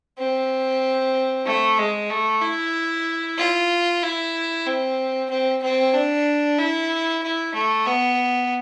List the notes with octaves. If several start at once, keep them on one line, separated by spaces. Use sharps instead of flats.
C4
A3
G#3
A3
E4
F4
E4
C4
C4
C4
D4
E4
E4
A3
B3